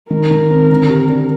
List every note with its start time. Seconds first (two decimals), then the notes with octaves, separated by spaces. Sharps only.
0.10 D#3 A#4
0.31 D#3
0.50 C4
0.71 D3
0.90 G4
1.09 D4